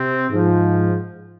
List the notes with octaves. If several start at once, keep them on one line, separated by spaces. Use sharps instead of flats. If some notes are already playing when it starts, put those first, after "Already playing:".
Already playing: C3 C4
G#2 F3